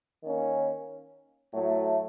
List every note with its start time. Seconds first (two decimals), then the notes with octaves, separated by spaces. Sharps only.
0.24 D#3 A#3 C#4
1.53 A2 F#3 A3